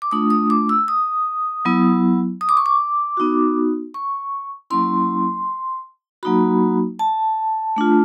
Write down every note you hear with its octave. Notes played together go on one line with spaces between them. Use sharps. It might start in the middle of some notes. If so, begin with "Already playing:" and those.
D6
A3 D4 F4 D#6
D#6
D6
E6
D#6
F#3 B3 E4
D#6
D6
C#6
D6
B3 D#4 F#4
C#6
F#3 A#3 C#4 E4 C6
F#3 A#3 D#4 F#4 B5
A5
A3 D4 F4